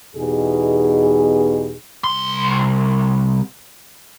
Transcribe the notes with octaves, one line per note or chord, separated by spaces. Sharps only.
E2 B2 D#4 G4 G#4
C2 C6